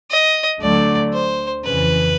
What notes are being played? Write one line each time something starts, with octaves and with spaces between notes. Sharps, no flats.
D#5
D2 D3 F#3 A3 D5
C5
F2 C#3 E3 B4